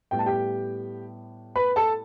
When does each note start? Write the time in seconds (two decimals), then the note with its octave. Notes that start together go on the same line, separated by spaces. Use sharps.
0.11 A2 G3 B3 E4 G5
0.19 A5
0.26 G4 G5
1.56 B4 B5
1.76 A4 A5